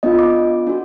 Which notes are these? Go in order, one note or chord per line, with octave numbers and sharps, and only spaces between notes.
B3 D4 F4 D#5
D6
D4 F#4